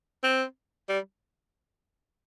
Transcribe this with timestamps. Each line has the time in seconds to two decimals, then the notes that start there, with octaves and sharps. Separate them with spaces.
0.24 C4
0.89 G3